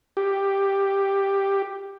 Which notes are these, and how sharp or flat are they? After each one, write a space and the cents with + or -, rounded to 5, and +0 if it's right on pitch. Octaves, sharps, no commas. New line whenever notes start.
G4 +5